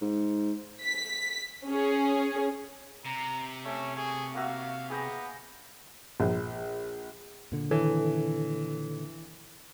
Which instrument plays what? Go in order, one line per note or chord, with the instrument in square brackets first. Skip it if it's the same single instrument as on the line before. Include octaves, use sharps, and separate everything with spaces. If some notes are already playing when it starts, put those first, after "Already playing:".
[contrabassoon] G#2
[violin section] B6
C#4 G#4
[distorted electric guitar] C3 [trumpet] A#5
[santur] A3 [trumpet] C#4
[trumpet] G#4 [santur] C#6
[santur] A#3 F#4 E5 [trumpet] F5
[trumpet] B3 [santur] G#4 G5 A#5
[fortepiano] A#1
[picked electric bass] A#2 D3
[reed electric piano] D#3 A4 C#5 [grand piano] E3